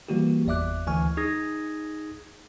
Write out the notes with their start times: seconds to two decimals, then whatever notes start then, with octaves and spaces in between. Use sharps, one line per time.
0.08 E3 G3 A#3 F#4 G4
0.46 G1 E2 D5 E5 D6 F#6
0.87 D2 E3 G#5 C#6 F6
1.17 D#4 G#4 D#6 G#6 A#6